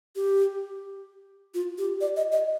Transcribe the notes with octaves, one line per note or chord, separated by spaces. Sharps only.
G4
F4
G4
D5
D#5
D#5